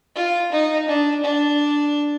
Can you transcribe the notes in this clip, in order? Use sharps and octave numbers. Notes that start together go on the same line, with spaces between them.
F4
D#4
D4
D4